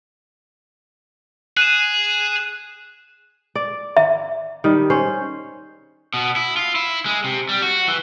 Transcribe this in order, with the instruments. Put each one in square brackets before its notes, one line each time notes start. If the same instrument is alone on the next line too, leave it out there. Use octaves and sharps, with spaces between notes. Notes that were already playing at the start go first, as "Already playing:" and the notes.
[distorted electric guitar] G#4 [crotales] F#6 D#7 E7
[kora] D5
[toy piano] E5
[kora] D#3 G3
C#4 C5
[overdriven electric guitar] B2
E4
F4
E4
G#3
C3
G3
F#4
E3